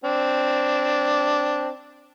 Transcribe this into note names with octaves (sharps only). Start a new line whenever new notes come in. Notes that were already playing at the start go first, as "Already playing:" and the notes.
C4 D4